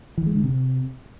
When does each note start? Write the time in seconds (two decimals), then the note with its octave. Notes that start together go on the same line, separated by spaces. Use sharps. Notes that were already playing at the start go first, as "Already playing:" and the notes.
0.18 E3
0.26 G#3
0.35 D3
0.44 C3